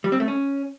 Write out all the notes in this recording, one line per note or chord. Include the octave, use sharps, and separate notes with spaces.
G3
C4
A3
C#4